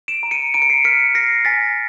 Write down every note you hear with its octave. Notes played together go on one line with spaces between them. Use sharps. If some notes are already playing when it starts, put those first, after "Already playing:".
D7 E7
A#5
C#7 D#7
A#5 D7
C#7
C7 D7
F6 B6 C#7
F6 A#6 C7
G#5 A6 B6